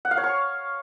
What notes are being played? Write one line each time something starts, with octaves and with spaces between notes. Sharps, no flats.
F#5
F5
C#5
C#6